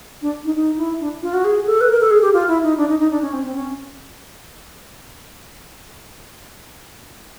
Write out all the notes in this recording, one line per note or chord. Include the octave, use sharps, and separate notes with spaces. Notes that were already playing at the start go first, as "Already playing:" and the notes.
D4
D#4
D#4
E4
D4
F4
F#4
G#4
A4
B4
A#4
A4
G#4
G4
F4
E4
D#4
D4
D#4
D#4
D4
C#4
C4
C4
C#4